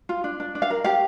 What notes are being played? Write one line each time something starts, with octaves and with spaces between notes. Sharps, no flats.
F4
D4
D4
D4
F5
A#4
G4 F5